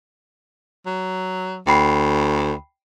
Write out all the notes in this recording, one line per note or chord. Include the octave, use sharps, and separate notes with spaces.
F#3
D2 G5 B5 C7